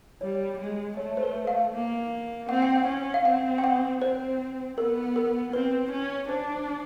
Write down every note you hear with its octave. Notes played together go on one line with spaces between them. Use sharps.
G3 C#5
G#3
A3 C#5
C5
B4
F5
A#3
C4 F#5
G5
F#5
C#4
F5
C4 F#5
G5
F#5
C4 C5
B3 A#4
A#4
C4 B4
C#4
D4 C5